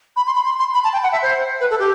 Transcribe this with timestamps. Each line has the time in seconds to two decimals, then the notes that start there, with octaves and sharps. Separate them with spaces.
0.16 B5
0.27 C6
0.35 B5
0.45 C6
0.59 C6
0.74 B5
0.84 A5
0.93 G5
1.03 F#5
1.12 E5
1.23 C5
1.60 B4
1.70 A4
1.79 G4